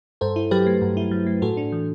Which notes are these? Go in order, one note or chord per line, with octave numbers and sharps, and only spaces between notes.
G2 A4 C5
E4
F#3 G4 B4
A3
G2
E4
F#3
A3
A2 F#4 A4
D4
E3